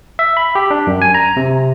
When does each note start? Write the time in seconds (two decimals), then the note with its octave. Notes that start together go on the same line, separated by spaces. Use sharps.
0.19 E5
0.37 B5
0.55 G4
0.71 D4
0.87 F#2
1.02 G#5
1.14 A#5
1.37 C3